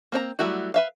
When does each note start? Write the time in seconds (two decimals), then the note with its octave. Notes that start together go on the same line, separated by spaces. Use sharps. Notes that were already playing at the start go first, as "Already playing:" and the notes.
0.12 A#3 C4 D5 A#5
0.39 F#3 G3 A3 E4 F#4
0.74 B4 E5 F5